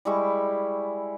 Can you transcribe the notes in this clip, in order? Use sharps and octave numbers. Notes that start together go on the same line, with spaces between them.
G3 G#3 E4 C#6